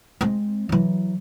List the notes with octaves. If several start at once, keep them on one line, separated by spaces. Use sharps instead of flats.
G#3 C4
E3 F#3